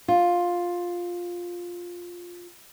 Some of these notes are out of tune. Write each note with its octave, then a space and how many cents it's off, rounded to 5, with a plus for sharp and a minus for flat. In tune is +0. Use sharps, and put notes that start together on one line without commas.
F4 +10